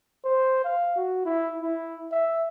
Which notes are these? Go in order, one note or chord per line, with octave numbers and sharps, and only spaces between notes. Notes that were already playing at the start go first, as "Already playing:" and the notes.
C5
F5
F#4
E4
E4
E5